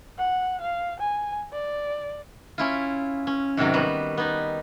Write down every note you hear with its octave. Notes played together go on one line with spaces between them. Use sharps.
F#5
F5
G#5
D5
C#4 E4 F4
C#4
G#2 C3 D#3 F#3
G3 B3 F#4
B3 D#4